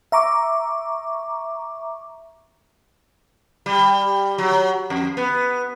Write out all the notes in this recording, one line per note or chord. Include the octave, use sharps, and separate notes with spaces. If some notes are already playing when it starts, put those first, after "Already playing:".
E5 A#5 C#6 D6
G3
F#3
F2
B3